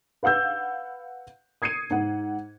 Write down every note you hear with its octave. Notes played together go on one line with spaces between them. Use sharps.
B4 F5 F#5 E6 G6
D#6 G#6 C7 C#7 D#7
G#2 F#5